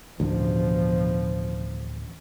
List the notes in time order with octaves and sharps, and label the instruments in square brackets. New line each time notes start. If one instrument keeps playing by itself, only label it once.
[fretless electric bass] A1 D2 [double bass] B2 F3